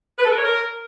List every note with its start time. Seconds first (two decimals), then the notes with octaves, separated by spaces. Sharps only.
0.18 B4
0.25 A4
0.31 A#4
0.38 C#5
0.44 A#4